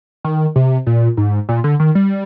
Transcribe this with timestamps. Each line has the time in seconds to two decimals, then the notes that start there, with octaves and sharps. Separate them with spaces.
0.24 D#3
0.56 C3
0.87 A#2
1.17 G#2
1.49 A#2
1.64 D3
1.80 D#3
1.95 G3